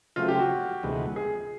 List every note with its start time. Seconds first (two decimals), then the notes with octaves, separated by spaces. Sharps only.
0.16 C#3 F#3 A3 C4 F4
0.28 G4
0.39 F#4
0.83 D2 C3 E3 G#3 B3
1.16 G#4